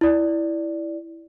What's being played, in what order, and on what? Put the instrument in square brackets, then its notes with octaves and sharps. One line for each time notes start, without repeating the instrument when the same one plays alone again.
[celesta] E4 D5